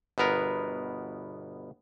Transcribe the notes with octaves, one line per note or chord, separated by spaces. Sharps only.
G1 B2 B3 A#4